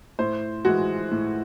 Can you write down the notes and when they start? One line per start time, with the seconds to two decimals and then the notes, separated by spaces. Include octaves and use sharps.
0.19 A2 C5
0.65 E3 G#3 F#4
1.11 A2